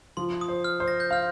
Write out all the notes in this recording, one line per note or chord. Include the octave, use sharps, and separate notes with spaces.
F3 C6
D#6
C5
F6
C5
A#6
G6
F5 F6